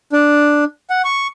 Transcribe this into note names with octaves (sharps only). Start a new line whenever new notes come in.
D4
F#5
C#6